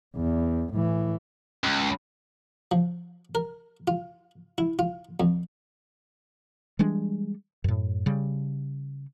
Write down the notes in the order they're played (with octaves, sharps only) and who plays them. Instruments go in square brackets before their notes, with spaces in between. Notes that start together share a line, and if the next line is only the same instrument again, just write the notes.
[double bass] E2
A2 E3
[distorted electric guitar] C#2
[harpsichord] F3
A#4
F4
E4
F4
F2
[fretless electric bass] E3 G3 G#3 D4
F#2 A2
C#3 G3